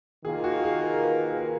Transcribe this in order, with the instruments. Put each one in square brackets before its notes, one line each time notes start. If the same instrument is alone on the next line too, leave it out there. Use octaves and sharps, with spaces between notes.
[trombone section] D#3 A#3 F4 [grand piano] G#4
[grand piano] F#4
G#4
A#4
B4
G#4
A#4